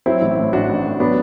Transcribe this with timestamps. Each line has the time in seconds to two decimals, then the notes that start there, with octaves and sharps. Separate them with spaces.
0.06 F#3 C4 E4
0.22 A1
0.37 A2
0.53 A1 D4 F#4
0.69 A1
0.85 A1
1.00 F#3 B3 D4